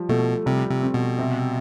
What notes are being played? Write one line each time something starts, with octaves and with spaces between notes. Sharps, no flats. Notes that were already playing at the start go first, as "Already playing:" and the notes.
Already playing: F3 G3
B2 A3
C3 G3
C3
C4
B2
C3